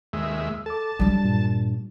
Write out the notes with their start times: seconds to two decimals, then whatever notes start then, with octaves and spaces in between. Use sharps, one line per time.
0.13 D#2 G#3 E5
0.66 A4 A5 D6
0.99 F#3 G3 D4
1.25 G2 A#2